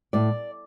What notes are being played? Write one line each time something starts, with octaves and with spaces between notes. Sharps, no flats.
A2 D5